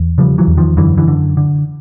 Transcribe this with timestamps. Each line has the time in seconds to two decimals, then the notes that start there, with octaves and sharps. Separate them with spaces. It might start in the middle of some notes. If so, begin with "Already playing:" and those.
Already playing: E2
0.18 C#3 F3 G3
0.38 E3 F#3
0.47 E2
0.57 D#3 F3
0.77 F#2 D3 E3
0.97 D3 E3
1.08 D3
1.37 D3